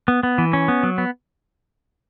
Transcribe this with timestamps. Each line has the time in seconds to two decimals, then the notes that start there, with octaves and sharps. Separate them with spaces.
0.08 B3
0.23 B3
0.38 E3
0.53 C#4
0.68 B3
0.83 F#3
0.98 B3